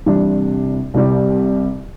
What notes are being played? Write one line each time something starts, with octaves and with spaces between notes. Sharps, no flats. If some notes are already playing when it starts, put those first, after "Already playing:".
C2 C3 E3 G3 D4
C2 C3 G3